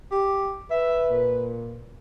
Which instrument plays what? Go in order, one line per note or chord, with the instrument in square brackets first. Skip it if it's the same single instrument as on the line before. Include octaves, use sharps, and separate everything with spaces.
[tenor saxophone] G4
[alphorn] B4 [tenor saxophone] E5
[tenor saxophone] A#2